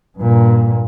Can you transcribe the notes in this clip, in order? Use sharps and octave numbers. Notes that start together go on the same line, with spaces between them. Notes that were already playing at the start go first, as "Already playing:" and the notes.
G2 A#2